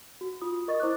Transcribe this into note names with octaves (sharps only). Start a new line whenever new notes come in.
F#4
F4 D#6
A#4 D#5 C#6 D#6 A6
E4 C5 D6 F#6